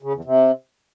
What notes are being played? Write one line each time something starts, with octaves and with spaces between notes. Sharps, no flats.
C#3
E2
C3